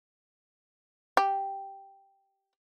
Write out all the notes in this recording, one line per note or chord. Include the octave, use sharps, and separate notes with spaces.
G4